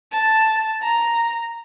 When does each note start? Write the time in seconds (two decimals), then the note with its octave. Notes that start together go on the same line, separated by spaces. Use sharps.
0.13 A5
0.83 A#5